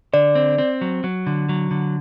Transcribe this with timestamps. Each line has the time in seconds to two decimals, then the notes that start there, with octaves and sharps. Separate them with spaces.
0.13 D3 D5
0.35 C4
0.58 C4
0.81 F#3
1.04 F#3
1.27 D3
1.49 F#3
1.71 D3